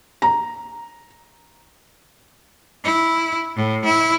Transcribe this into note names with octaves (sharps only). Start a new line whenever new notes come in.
A#5
E4
A2
E4